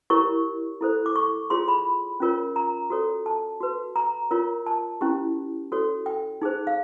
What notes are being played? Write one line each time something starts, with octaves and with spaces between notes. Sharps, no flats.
E4 G4 A#4 C#5 C#6
E4 A4 C5
D6
C#6
F4 G#4 C#5 C6
B5
C#4 F4 A#4 C#5
A#5
F#4 A4 C#5
A5
F#4 B4
A#5
F4 A#4 C#5
A5
C#4 E4 G4
F#4 A4 C#5
G5
D#4 G#4 C5
F5